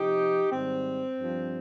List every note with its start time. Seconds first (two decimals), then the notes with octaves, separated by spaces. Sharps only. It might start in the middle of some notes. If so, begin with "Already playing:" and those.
Already playing: C3 F3 D#4 G4
0.51 G#2 D#3 G3 C4
1.17 G2 F3